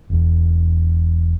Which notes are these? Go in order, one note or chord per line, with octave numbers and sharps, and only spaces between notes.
E1 E2